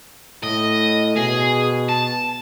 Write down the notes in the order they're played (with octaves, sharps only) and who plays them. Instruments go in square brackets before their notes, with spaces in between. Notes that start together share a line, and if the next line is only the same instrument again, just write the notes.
[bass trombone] A2 [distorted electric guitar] D#5
[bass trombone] B2 [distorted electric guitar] G#4
[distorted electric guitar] A5